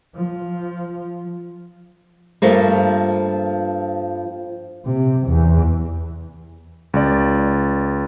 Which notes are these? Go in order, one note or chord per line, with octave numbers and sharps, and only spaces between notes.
F3
G2 F3 A3 A#3
C3
E2
C#2 D5